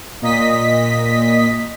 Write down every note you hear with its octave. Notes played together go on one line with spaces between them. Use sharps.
A#2 D#5 B6